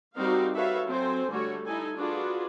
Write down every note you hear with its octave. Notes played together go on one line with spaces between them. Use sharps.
G3 C4 D#4 F#4 A#4 F5
F#4 A4 B4 C#5 E5 F5
F#3 C4 A4 C5 G#5
D3 G3 A3 F#4 C#5
D#4 E4 A4 G#5
D4 F4 F#4 G#4 B4